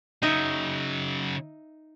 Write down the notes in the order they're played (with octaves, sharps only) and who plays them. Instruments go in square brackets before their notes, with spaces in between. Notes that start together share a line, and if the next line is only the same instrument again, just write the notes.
[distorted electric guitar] C#3 F#3 [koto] D#4 E5